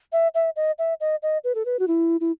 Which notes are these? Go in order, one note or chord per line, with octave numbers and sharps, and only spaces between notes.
E5
E5
D#5
E5
D#5
D#5
B4
A4
B4
F#4
E4
E4